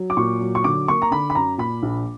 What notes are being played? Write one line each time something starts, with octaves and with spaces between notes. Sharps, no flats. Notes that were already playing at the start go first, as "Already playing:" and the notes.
Already playing: F#3
D6
A#2 C#6
F#3
C#6
D3 D6
A#3 C#6
A#5
D3 B5
B5
F#2 A#5
A#2 B5
A#1